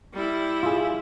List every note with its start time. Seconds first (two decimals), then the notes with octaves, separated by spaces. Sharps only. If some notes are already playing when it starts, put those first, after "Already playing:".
0.13 G3 E4
0.63 F4 G#4